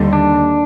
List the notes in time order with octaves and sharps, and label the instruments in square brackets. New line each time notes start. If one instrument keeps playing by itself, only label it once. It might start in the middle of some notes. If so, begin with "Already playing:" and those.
Already playing: [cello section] D#2 D3 G3
[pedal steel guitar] D4